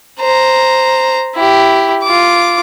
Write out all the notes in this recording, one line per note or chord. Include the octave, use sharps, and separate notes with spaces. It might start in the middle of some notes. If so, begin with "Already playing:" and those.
C5 A#5
E4 G4
F4 D6